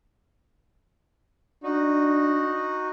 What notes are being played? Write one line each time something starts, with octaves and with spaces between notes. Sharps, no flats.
D4 D#4 F#4